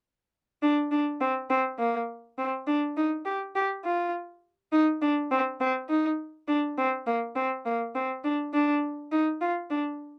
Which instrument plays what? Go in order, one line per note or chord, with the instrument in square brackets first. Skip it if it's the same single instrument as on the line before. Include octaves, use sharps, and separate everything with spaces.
[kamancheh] D4
D4
C4
C4
A#3
C4
D4
D#4
G4
G4
F4
D#4
D4
C4
C4
D#4
D4
C4
A#3
C4
A#3
C4
D4
D4
D#4
F4
D4